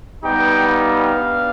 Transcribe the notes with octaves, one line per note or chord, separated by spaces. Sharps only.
G3 B3 D#4 G4 G5
F5
B3 D4 G4